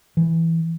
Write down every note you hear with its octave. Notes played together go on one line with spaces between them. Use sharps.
E3